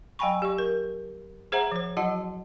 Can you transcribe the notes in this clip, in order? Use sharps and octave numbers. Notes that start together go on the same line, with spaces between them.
F#3 F5 G5 G#5 B5 C#6
G4 D5 C#6
A#4
G#4 C5 E5 F#5 A#5
F3 C5
F#3 E4 F#4 D#5 F#5 A5